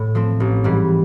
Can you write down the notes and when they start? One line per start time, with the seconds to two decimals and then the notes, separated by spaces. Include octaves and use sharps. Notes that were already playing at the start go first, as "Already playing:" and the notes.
Already playing: A2
0.15 F3 A3 C4
0.40 A1
0.64 G#2 E3 G3